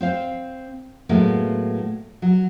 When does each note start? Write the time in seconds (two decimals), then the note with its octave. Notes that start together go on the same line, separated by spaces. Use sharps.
0.01 C4 C5 F5
1.09 A2 F#3 G#3 A#3 B3
2.22 F#3